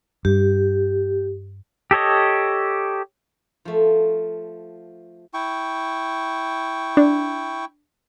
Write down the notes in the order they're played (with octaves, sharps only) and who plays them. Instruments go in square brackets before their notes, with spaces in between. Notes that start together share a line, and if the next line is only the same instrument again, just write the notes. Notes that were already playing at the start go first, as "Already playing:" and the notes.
[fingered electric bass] G2 [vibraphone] G4
[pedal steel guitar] G4 A4 C#5 D#5
[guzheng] F3 A3
[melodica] E4 G5 C#6
[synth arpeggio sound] D4